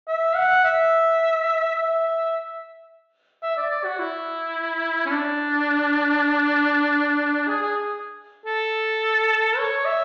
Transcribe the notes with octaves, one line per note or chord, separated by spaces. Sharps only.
E5
F#5
E5
E5
E5
D5
D5
F#4
E4
C#4
D4
G#4
G#4
A4
C#5
E5